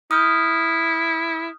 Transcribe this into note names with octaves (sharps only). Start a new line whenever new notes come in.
E4 D#6 F6 G6